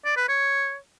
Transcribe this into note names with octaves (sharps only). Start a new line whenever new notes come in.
D5
B4
C#5